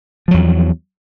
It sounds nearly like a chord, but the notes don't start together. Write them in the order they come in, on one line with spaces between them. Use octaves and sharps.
F3 F#3 E2